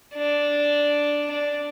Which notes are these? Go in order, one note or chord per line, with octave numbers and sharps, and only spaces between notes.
D4
D4